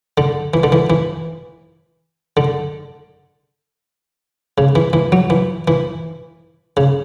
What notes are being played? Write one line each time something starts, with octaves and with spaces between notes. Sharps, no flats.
D3
E3
D3
E3
E3
D3
C#3
E3
E3
F#3
E3
E3
C#3